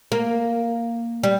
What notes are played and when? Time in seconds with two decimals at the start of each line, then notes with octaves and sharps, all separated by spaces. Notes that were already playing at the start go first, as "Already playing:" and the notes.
0.12 A#3
1.23 G3